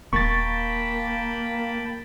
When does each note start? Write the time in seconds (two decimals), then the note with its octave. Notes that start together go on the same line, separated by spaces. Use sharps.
0.13 D#1 A#3 G5 A5 B5 C#6 A6